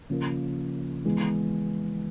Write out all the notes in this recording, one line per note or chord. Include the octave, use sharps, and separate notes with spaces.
C#3 F3 A#3
E3 G#3 B3